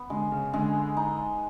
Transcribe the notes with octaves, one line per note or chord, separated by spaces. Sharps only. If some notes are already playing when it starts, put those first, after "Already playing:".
Already playing: B3
D3 G#3
C#3
D3 G#3
D#4